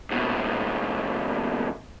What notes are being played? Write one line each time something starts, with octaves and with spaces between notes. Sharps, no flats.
D#2 B2